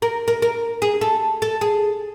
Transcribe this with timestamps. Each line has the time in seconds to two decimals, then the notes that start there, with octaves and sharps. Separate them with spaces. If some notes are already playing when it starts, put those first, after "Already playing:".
0.02 A#4
0.28 A#4
0.42 A#4
0.82 G#4
1.01 A4
1.42 A4
1.61 G#4